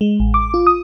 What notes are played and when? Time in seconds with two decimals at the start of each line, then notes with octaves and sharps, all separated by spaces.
0.01 G#3
0.20 A1
0.34 D6
0.54 F4
0.67 D#6